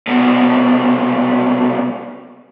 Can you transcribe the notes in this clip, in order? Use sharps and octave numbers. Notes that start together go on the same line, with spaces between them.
C2 B2